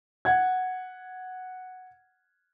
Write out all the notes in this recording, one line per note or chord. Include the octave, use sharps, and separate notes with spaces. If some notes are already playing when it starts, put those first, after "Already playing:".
F#5 G#6